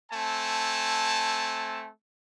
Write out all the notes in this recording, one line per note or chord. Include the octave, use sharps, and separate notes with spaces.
A3 C4 G#5 A5